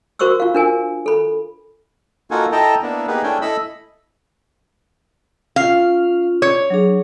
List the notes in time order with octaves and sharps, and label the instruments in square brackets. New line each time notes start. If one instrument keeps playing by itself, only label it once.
[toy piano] F#4 A#4 C5 C#6 D6 E6
F4 F5
D4 A#4 G#5
A4 B5
[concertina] A#3 D#4 F4 F#4 A4 G#5
E4 A4 D#5 G5 A5 A#5
A#3 B3 D4 E4
A#3 B3 D#4 G4 G#4 B4
A3 C#4 D4 E4 G5 G#5
E4 A4 D#5 B5 E6
[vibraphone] C#4 F4 [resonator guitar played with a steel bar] F5
[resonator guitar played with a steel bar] C#5
[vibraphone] F#3 D4 G#4